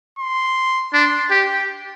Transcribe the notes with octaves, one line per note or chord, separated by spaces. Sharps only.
C6
D4 C6
G4 G5